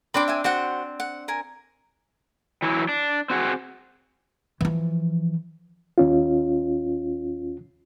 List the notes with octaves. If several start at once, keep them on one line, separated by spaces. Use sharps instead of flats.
C4 D4 B5 C6 D6
E5 G5 G#5
C4 F#4 C5 F#5
F#5
A#4 G#5
E3 F#3 E4
D4
C4 F#4 G#4
E3 F3
D#2 C#4 F4